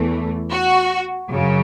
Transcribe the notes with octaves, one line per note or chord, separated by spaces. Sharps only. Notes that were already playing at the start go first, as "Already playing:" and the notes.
Already playing: E2 E3 A3
F#4
F#2 C#3